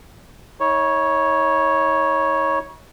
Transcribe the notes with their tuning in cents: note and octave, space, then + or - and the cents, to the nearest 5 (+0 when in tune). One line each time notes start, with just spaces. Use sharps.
D#4 +45 C#5 +0